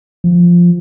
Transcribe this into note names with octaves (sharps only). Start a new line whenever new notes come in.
F3